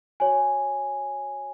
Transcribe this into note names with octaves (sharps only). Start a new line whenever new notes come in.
F#4 C#5 G#5